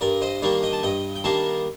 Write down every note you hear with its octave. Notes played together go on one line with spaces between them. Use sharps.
G2 A#4 D5
C5 D#5
D#3 G3 A#3 D4 D5 F5
D#5 G5
A5
G2 D#5 G5
G5
D#3 G3 A#3 D4 F5 A5